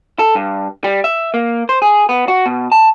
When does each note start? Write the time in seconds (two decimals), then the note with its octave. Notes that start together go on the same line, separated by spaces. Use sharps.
0.19 A4
0.35 G2
0.84 G3
1.04 E5
1.34 A#3
1.69 C5
1.82 G#4
2.09 B3
2.28 F#4
2.46 B2
2.72 A5